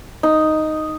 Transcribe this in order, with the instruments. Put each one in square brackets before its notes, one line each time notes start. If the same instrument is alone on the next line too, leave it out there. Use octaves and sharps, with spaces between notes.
[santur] D#4